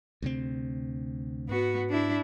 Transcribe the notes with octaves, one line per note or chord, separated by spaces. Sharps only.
D2 C3 C4
G#2 B3 F#4
D4 E4